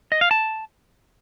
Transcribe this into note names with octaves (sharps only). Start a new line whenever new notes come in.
D#5
F5
A5